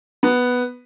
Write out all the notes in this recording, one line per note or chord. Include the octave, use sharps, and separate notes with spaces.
B3